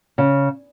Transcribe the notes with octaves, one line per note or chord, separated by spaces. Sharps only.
C#3